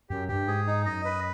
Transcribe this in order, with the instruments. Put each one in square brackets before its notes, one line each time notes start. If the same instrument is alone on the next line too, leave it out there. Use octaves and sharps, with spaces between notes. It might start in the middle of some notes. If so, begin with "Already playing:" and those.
[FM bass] F#2 [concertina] G4
[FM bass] G2 [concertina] G4
[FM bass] G#2 [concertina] G#4
[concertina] D#4
[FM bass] F#2 [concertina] D#5
[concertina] B4